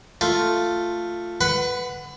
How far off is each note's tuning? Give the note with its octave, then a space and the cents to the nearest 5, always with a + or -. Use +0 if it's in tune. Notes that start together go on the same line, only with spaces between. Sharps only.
A3 +5 F4 +0
B4 +0 F#5 +0 B5 +35